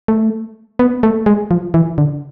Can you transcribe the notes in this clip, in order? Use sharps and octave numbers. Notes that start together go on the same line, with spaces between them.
A3
B3
A3
G#3
F3
E3
D3